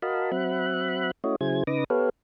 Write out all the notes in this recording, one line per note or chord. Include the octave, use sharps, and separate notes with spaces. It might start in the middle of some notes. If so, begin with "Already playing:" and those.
F#4 A#4 D#5 F5 A5 B5
F#3 C4 E5 F#5 B5 F#6
A3 C#4 E4 F#4 C#5 D#5
C#3 F#3 E4 G#4 C5 G#6
C#3 D#4 B4 D6 D#6 A#6
B3 G4 A4 B4 C#5 F5